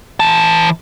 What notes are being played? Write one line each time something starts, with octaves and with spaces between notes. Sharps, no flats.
E3 A5